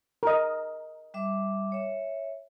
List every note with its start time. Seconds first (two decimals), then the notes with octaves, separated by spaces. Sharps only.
0.23 A#4 D#5
1.14 G3 E5 D6
1.72 C#5 E5